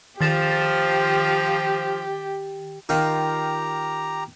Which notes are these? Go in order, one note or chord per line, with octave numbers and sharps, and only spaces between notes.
D#3 F3 G4 A6 E7
D#3 F4 G4 A#5